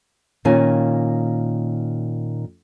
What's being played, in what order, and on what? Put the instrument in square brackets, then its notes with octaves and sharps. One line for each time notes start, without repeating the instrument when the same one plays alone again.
[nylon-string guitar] A#2 D#3 C#4 F4 G#5